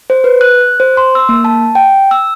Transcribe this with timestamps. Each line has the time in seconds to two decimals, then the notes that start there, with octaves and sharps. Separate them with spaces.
0.10 C5
0.24 B4
0.41 F#6
0.61 F#6
0.80 C5
0.97 C6
1.15 E6
1.29 A#3
1.45 A5
1.75 G5
2.11 E6